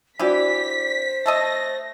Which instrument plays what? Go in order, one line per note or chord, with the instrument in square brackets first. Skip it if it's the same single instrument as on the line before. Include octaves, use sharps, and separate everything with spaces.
[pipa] E3 G4 [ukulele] D4 F#4 D5 [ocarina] C5 [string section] B6
[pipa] A3 A4 D#5 [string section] A#6